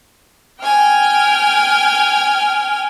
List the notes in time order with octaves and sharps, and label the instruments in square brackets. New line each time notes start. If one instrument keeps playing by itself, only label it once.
[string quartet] G5 G#5 F6